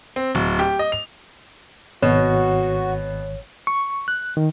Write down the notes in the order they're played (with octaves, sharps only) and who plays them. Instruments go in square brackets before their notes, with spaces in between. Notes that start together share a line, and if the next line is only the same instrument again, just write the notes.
[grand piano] C4
D1
G4
D#5
F7
[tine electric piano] G#1 [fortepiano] B2 [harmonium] F#4 [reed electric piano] C#5
[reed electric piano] C#6
F#6
D#3